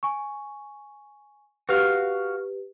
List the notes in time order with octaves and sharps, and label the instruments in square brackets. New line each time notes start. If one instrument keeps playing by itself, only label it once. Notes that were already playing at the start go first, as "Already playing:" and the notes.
[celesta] G#5 C#6
[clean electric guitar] F#4 F5 [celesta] G4 B4